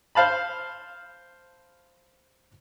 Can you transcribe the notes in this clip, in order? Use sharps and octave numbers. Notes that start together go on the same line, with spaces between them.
C5 F5 A5 B5